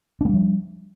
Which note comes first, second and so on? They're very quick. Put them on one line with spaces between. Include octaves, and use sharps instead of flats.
D4 A#3 G3 F3